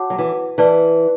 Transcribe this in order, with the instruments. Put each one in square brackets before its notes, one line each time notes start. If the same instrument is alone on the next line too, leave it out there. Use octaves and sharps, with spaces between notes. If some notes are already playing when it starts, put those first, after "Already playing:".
Already playing: [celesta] F#4 C#5 F#5 A5 D6
[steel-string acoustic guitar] F#3
E3
[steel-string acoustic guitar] E3 [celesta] B4 D5 A5